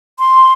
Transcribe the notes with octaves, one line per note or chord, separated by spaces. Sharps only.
C6